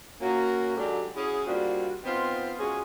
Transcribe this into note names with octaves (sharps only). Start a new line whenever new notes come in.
A#3 C#4 F#4
F#3 G#3 C#4 D4 G4 A4
C#4 E4 F#4 G#4
G3 A#3 C4 D4 F4 F#4
B3 C4 D#4 F4 C5
G#3 C#4 F4 F#4 G#4